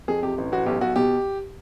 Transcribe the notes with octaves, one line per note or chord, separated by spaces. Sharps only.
F2 G#4
C3 G4
A1
A1 F#4
B1 G4
B1 F#4
B2 G4